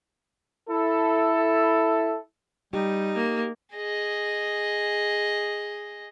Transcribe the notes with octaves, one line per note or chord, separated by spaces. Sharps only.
E4 A4
G3 D#4 G4
A#3
G#4 D#5